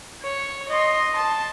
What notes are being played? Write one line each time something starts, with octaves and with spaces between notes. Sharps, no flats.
C#5
D#5 C6
A5